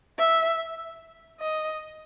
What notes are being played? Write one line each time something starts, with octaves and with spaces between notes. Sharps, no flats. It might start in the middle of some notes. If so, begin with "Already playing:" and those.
E5
D#5